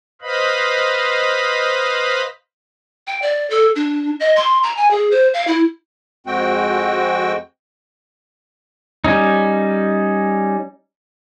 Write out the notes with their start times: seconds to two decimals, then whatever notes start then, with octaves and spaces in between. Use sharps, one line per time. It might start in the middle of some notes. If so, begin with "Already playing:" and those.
0.22 B4 C5 D#5 F5 B5
3.07 G5
3.22 D5
3.50 A4
3.76 D4
4.20 D#5
4.36 C6
4.63 A#5
4.77 G#5
4.91 G#4
5.11 C5
5.34 F5
5.47 E4
6.27 F2 G#3 C4 F#4 G5
9.04 G3 C#4 D#4